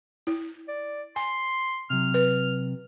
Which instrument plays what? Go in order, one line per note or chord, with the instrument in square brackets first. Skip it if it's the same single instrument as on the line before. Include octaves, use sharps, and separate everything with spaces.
[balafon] E4
[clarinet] D5
[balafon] G#5 [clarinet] C6
[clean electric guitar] C3 F#3 [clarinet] F6
[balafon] B4